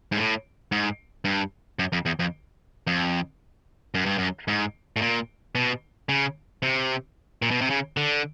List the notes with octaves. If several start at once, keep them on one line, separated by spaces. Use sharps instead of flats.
G#2
A2
G#2
G2
F#2
F2
E2
F2
F2
F#2
G2
F#2
G#2
A2
A#2
B2
C#3
C3
A#2
B2
C3
C#3
D3